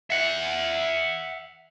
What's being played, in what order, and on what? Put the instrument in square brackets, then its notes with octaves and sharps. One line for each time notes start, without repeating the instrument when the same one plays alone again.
[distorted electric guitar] E5 F#5